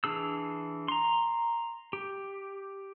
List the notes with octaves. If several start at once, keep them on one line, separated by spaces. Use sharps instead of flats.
E3 D4 G#4 E6
A#5 C6
G4